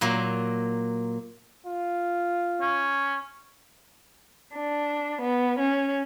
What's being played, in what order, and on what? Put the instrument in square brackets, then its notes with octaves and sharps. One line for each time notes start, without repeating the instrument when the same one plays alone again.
[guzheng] A#2 F#3 A#3
[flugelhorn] F4
[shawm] C#4
[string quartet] D4
B3
C#4